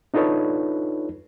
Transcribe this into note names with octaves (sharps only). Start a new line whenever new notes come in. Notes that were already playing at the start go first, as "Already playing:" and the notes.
D4 D#4 F4 A4 B4 C#5